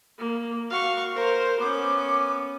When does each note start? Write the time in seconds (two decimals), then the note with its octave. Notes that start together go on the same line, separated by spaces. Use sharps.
0.18 A#3
0.71 F#4 F5 C#6
1.15 A#4 C5
1.60 B3 C#4 D6